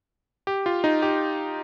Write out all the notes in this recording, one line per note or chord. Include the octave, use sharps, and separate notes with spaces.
G4
F4
D#4
G4